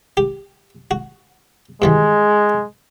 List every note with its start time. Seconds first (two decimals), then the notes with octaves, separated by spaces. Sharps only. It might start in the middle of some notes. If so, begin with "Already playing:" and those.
0.17 G4
0.91 F#4
1.82 G2 D#3 E3 G#3